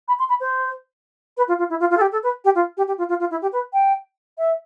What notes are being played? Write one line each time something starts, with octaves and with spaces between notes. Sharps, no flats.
B5
C6
B5
C5
B4
F4
F4
E4
F4
F4
A4
G4
A4
B4
G4
F4
G4
G4
F4
F4
F4
E4
G4
B4
G5
E5